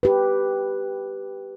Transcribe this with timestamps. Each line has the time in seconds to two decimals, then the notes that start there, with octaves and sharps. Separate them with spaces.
0.03 G4 B4